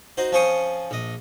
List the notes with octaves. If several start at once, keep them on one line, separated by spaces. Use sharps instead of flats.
D#4 F#4 C5
F3 C4 C#4 C5 C#6 D#6
A#1 D#5